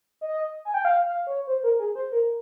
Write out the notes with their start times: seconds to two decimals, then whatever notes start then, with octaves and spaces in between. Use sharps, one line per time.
0.21 D#5
0.65 G#5
0.74 G5
0.85 F5
1.06 F5
1.27 C#5
1.47 C5
1.64 A#4
1.79 G#4
1.95 C5
2.12 A#4